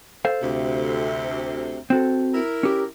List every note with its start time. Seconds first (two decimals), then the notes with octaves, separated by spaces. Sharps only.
0.25 A4 C5 F5
0.41 D2 C3
1.90 C4 F#4 A4
2.33 E4 A#4
2.63 C#4 G4